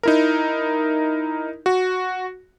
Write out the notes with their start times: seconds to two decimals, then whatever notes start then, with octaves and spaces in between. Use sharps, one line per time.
0.03 D#4 E4 A#4
1.66 F#4